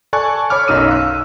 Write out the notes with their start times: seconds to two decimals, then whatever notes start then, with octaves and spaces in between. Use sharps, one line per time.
0.13 A4 D5 G#5 A5 C#6 F#6
0.50 C#5 B5 D6 F6
0.68 B1 F#2 D#4 E6 D#7
0.88 F5 F#6